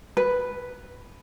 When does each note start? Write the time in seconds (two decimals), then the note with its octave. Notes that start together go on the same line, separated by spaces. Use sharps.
0.17 B4